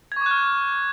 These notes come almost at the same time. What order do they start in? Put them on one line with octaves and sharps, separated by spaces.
G#6 C#6 D6 F#6 F6